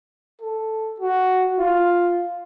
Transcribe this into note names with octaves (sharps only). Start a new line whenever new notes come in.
A4
F#4
F4